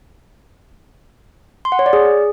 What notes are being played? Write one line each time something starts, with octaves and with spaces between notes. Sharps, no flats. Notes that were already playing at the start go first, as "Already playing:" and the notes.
C6
F#5
C#5
D5
G#4